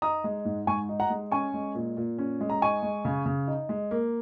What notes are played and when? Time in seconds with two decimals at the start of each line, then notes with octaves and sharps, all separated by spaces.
0.02 D#4 A#5 D#6
0.24 G#3
0.45 G#2
0.67 G#2 G#5 C#6
0.89 D#4
1.00 F#5 A#5
1.10 G#3
1.32 C#4 G#5 C#6
1.54 G#3
1.75 A#2
1.97 A#2
2.18 C#4
2.41 G#3
2.50 A#5
2.62 D#4 G#5 C#6
2.83 G#3
3.05 C#3
3.26 C#3
3.48 D#4
3.69 G#3
3.91 A#3